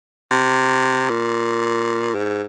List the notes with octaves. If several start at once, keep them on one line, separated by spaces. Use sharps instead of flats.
C3
A#2
G#2